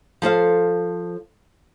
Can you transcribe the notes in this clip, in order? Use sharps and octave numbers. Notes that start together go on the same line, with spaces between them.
F3 A4 C5 F5